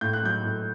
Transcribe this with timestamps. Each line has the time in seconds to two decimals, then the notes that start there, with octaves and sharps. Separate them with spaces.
0.01 A2 G6
0.13 F#6
0.23 F#3 G6
0.44 A2